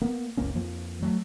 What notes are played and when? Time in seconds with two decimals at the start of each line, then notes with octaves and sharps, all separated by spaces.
0.01 A#3 B3
0.37 F#1 C#2 A#3 C#4
0.55 F2 F3 A#3
1.02 F#3 G3 A3